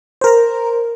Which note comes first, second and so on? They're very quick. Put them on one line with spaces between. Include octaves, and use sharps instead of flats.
C5 A#4 A#5